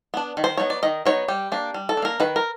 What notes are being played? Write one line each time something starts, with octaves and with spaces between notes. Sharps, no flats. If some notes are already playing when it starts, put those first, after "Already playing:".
B3 D4
D#3
C5
F#3 B3 D#4 C#5
D5
D#3 D#5
F#3 B3 D#4 C#5
G3 G4
A#3 D4
G3
A4
D4
A#3 A#4
D#3 B4
A#4